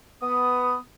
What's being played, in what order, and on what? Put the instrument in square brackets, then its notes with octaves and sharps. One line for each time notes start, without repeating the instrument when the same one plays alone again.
[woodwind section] B3 D#6